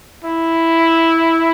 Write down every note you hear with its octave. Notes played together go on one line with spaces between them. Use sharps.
E4